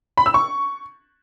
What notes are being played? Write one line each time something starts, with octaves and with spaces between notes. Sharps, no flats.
B5
E6
C#6